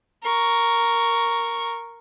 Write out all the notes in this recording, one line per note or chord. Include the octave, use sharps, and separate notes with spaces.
A#4 C#6